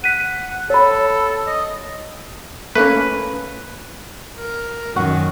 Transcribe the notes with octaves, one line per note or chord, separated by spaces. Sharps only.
F#5 B6 D#7
A4 C#5 B5
D#5
A3 A#3 C#4 B4
A#4
F#2 A#2 D#3 F#4